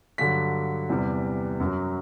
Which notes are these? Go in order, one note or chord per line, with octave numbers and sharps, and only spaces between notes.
G2 D3 F#3 B6
E2 C3 E3 G3
F#2 F#3